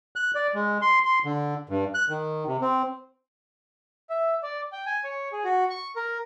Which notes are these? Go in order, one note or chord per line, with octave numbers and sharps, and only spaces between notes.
F#6
D5
G#3
C6
C6
D3
G2
F#6
D#3
C3
C4
E5
D5
G5
G#5
C#5
G#4
F#4
C#6
A#4